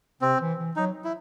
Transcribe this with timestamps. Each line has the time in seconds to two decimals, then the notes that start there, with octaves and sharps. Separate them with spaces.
0.21 C3 C4
0.40 E3
0.59 E3
0.76 F#3 D#4
1.04 E4